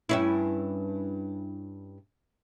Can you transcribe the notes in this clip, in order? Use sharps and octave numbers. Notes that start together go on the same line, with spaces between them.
G2 C#4 E4